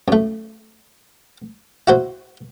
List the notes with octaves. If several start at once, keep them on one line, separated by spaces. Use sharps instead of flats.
F#2 A3
E4 F#4 C5